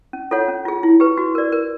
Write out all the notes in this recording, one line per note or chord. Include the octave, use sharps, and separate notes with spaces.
C#4
F4 A4 C#5 F#5
C#4
F4 G#4
E4
G4 B4
F#4
A#4 D5
A#4